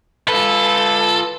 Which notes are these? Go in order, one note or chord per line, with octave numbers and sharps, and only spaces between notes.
F4 A4 B4